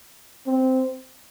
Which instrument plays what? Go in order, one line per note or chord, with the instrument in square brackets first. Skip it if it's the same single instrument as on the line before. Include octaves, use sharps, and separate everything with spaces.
[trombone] C4